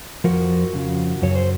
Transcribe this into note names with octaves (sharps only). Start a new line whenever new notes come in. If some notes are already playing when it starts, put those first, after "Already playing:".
F2 C#3 F3 F#4 A#4
F2 C#3 F3
F#2 C#3 F#3 C#5
C5